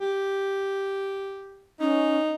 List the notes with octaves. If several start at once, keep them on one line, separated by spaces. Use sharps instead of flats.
G4
C#4 D#4